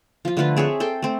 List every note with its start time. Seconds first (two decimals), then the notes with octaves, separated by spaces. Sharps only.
0.25 F3 F4
0.37 D3 A3 F4 B4
0.56 C4 G#4 C#5 E5
0.80 A4 G5 C6
1.02 A3 C4